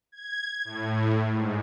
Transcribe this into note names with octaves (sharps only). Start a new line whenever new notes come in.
G#6
A2
G#2